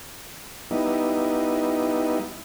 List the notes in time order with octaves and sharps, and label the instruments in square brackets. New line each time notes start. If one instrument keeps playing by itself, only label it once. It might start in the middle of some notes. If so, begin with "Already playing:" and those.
[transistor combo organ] G3 B3 D#4 E4